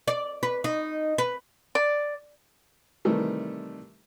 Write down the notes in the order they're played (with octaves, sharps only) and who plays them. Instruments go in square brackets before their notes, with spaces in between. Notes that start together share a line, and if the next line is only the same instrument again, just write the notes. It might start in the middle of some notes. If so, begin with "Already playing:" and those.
[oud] D5
B4
D#4
B4
[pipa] D5
[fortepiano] C3 D#3 E3 G3 A3